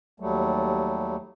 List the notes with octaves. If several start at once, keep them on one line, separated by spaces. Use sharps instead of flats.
D#2 F#3 G3 A3